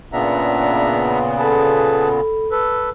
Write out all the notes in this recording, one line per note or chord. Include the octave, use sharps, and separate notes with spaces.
A#2 C#3 B3 D4 E5 A#5
G#4 A4 B4 A5 B5
A4 B4